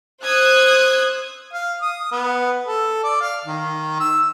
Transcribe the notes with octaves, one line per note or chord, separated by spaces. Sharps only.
C5 D#6 E6 F#6 G#6
F5
D#6
B3
A4
D5
F5
D#3
E6